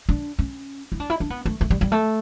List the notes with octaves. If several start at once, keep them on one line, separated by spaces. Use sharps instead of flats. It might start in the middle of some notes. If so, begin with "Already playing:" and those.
D4
C#4
E4
D4
E4
D4
B3
A3
A3
G3
G3
A3